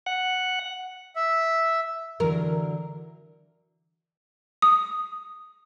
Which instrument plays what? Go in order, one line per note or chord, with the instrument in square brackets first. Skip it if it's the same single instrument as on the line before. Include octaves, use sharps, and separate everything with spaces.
[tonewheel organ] F#5
[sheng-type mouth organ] E5
[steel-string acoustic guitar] D3 E3 F#3 [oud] A#4
[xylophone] D#6